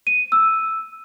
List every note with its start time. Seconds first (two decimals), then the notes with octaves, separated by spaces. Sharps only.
0.07 D#7
0.32 E6